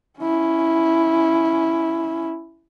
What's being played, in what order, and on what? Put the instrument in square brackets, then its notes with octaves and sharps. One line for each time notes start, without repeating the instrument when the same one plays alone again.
[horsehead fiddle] C#4 E4